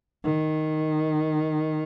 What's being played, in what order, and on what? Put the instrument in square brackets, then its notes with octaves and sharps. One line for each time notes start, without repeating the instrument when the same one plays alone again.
[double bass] D#3